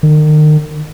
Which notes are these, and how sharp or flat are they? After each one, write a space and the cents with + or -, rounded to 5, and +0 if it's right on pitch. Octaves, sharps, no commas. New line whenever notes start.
D#3 -35